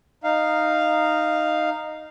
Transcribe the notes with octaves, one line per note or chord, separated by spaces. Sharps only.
D#4 F5